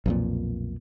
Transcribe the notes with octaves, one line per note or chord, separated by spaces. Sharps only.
B1 F2 A#2